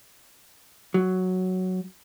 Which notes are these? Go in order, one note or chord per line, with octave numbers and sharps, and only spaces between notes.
F#3